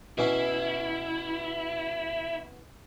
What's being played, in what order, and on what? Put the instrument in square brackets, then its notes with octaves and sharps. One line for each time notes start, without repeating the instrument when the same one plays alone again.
[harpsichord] B2 E3 C#4 [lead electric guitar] E4